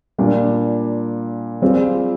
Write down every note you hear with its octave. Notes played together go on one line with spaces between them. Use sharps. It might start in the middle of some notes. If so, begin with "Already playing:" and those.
A#2 G3 D4
G3 C4 F4 G#4